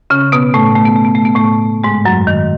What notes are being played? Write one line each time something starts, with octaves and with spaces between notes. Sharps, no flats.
C#3 C#4
B2 B3
A2 A3
A3
B3
A3
B3
A3
B3
A2 A3
G#2 G#3
F#2 F#3
D#3